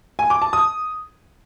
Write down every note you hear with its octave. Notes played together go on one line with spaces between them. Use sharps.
G#5
D6
A5
D#6